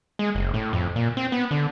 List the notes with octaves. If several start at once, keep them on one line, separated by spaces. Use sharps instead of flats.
G#3
F#1
A2
F2
A#2
C4
B3
D3